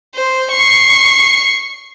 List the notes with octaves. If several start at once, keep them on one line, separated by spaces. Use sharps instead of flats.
C5
C#6 C7